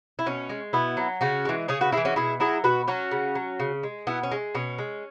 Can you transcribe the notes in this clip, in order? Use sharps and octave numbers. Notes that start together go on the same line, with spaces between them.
E4
B2 C#4
G#3
B2 B3 E4
F#3
C#3 C#4 F#4
E3 G#3
C#3 G#4 C#5
F#4 B4
G#3 E4 G#4
E3
C#4 F#4
B2 E4 G#4
F#3 E4 G#4
B2 F#4 B4
F#3 C#4 F#4
C#3
F#3
C#3
G#3
B2 B3 E4
C#4
G#3
B2 C#4
G#3